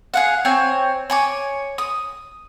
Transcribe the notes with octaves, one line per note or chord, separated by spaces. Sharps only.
G#4 F5 F#5
C4 C#5 G#5
C#5 G#5 D6
D#6